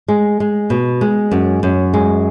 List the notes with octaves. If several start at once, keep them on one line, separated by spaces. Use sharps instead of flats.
G#3
G#3
B2
G#3
F#2
F#2
G#3